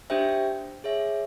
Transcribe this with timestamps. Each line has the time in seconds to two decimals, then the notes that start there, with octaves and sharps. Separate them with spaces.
0.10 D4 G4 C5 E5 G5
0.84 G#4 C#5 E5